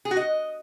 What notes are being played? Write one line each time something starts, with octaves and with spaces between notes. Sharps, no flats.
G#4
F#4
D#5